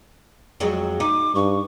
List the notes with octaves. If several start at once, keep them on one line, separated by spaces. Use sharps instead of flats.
F2 F#3 G#3
D#4 D6
G2 C#6